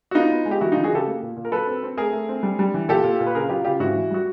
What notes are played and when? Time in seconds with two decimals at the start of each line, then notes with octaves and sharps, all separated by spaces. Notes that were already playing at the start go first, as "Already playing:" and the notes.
0.11 F#4
0.15 B3 D#4 F4
0.31 B3
0.45 G#3
0.51 G4
0.61 E3 E4 F#4
0.72 D#4 F4
0.77 E3
0.84 F#4 G#4
0.92 C#3 G4 A4
1.07 A#3
1.22 A#2
1.37 A#2
1.45 A#4
1.52 F#3 A4 B4
1.67 C4
1.83 C4
1.97 A3 G#4 A#4
2.13 A3
2.29 C4
2.43 G3
2.59 G3
2.74 E3
2.89 A#2 G4 A4
3.04 A#2
3.20 A#2
3.26 B4
3.35 C#3 G#4 A#4
3.49 F#3 F4 G4
3.64 C#3 F4 G4
3.80 G#2 E4 F#4
3.96 E3
4.11 G3 F#4